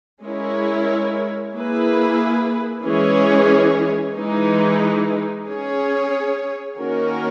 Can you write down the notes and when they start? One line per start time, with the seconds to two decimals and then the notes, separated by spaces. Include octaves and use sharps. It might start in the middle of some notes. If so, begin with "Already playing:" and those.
0.22 G#3 C#4 E4 A#4 C#5
1.54 A#3 E4 G#4 B4
2.84 E3 G#3 C#4 G#4 C#5
4.16 E3 G#3 D#4
5.47 C#4 G#4 C#5
6.77 D#3 A#3 C#4 F#4 A#4